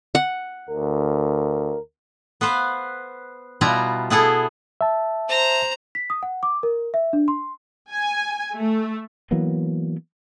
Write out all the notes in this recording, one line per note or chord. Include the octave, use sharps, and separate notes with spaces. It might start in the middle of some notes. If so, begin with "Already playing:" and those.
F#5
D2 A#4
B3 B4 C5 F5
B2 G3 B3 E4 F4 A#5
B3 E4 G#4 A4
E5 A5
C5 A#5
B6
D#6
F#5
D6
A#4
E5
D4
C6
G#5
A3
E3 F#3 A#3 B3